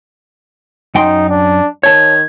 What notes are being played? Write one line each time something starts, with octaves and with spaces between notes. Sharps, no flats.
F#2 D#4 G5 C6
D4
D#3 C#5 A5 G#6